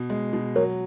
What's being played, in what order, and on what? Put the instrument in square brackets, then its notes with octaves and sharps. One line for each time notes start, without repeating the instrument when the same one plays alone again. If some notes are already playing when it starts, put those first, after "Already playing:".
Already playing: [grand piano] B2
G#3
B2
[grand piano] F#3 [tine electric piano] A#4 C#5